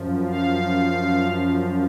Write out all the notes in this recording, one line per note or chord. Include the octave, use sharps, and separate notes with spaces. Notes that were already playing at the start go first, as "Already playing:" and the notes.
Already playing: F#2 F3
F5